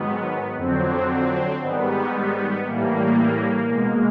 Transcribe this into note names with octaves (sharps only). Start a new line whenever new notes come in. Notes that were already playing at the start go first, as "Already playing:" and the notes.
Already playing: G#2 D#3 F#3 B3
F2 D3 F#3 C4
C4
G#2 D#3 G3 B3
B3
A2 E3 G3 A#3
B2 G#3